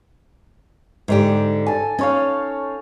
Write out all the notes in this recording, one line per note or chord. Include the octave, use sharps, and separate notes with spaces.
G#2 D3 G4
A4 G#5
C#4 D#4 C#5 F5